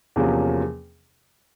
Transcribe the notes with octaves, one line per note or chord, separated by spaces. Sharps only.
E2 C3 F3 A#3 C#4